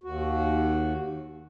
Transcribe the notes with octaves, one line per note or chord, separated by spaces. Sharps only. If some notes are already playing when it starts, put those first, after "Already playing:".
D#2 F#4